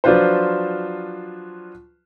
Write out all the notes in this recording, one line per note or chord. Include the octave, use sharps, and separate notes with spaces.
F3 F#3 D4 F4 B4 C5